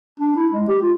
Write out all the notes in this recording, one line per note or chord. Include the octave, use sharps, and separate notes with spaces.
D4
E4
G#3
G4
F4